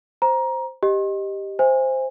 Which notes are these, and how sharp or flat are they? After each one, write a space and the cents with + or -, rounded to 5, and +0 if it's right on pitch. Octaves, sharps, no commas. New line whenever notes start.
C5 +0 A#5 +20
G4 +0 D#5 -5
C5 +0 E5 +0 G#5 -25